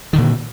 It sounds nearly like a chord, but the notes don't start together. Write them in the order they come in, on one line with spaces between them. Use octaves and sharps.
D#3 D3 A#2